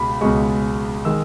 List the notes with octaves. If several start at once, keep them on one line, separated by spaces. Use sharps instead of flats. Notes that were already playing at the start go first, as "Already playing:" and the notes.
Already playing: C#2 B2 B5
C#2 B2 G#3 C#6
D#3 G#3 E6